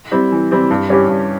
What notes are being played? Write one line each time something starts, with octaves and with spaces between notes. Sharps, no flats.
G3 C4 E4
E3
G3 C4 E4
G2
G3 C#4 E4 G4
G2